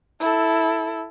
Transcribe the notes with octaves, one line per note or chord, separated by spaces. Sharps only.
E4 A4